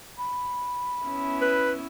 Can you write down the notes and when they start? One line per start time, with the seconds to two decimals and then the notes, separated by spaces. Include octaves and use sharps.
0.18 B5
1.04 B3 C#4 E4
1.42 B4